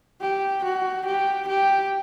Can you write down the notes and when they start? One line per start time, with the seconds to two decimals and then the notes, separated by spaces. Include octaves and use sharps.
0.21 G4
0.64 F#4
1.06 G4
1.48 G4